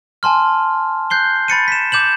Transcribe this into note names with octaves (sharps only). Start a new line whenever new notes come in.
G#5 A5 C6 F6
F#6 G6 C7 G7
B5 A6 C#7 D#7
B6 E7
D6 G6 E7 F#7